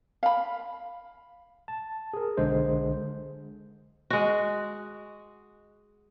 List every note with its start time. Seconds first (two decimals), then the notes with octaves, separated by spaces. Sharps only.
0.23 F5 B5
1.68 A5
2.14 G#4 A#4
2.37 B1 D3 G#3 C5
4.10 G#3 F#4